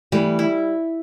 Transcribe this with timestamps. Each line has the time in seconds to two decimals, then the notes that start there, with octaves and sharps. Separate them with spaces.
0.12 E3 G3 A3
0.39 E4